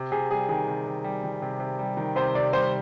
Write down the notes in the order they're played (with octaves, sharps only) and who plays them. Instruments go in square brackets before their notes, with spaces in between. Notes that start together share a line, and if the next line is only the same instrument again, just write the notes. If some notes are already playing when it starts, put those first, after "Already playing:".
Already playing: [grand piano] C3
[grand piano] C3 [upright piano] G#4
[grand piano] G3 [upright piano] G#4
[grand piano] D#3 [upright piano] G#4
[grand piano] C3
C3
G3
D#3
C3
C3
G3
D#3
[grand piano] C3 [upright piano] C5
[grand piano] C3 [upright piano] D5
[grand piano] G3 [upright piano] C5